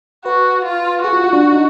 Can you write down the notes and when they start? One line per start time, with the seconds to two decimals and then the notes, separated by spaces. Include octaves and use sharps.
0.25 F#4 B4
0.65 F4
1.03 F#4 G#4
1.13 F4
1.24 F4
1.33 D4
1.53 D#4